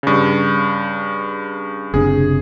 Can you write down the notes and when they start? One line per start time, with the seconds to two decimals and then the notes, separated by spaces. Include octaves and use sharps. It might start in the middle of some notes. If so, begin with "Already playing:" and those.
0.03 G2 C#3
1.94 F#1 C3 D4 G#4